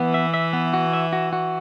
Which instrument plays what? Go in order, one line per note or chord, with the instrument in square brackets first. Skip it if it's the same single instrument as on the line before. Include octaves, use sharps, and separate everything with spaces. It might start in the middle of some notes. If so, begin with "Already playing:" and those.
Already playing: [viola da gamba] E3 [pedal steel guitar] B3
[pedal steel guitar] E5
E5
B3
F#4
E5
F#4
F#4